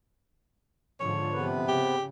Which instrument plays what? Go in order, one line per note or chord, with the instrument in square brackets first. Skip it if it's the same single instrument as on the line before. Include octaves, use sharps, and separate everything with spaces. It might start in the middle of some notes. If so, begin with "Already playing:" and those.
[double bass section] G#2 D3 F3 [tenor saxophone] C#5
[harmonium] C3 B3 B4
[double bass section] C#3 [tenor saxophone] G4